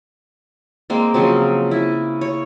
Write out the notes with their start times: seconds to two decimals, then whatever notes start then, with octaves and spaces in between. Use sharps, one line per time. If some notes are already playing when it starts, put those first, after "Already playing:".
0.90 G#3 A#3 C4
1.14 C#3 F3 F#3 C4
1.71 E4
2.21 C#5